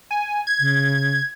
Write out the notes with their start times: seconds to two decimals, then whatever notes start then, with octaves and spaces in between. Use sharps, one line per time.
0.11 G#5
0.47 G#6
0.60 C#3